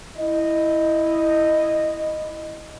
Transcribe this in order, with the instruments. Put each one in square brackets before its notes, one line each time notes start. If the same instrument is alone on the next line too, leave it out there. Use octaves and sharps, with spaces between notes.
[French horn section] E4 D#5